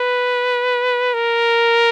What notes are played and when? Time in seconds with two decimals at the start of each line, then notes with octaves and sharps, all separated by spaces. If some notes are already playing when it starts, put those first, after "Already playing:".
Already playing: B4
1.14 A#4